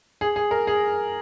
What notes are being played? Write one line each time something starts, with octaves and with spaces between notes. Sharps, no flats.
G#4
G#4
A#4
G#4